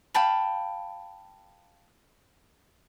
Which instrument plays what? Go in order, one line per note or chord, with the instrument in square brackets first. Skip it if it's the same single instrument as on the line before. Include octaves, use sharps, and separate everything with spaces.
[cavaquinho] F5 G5 A5 B5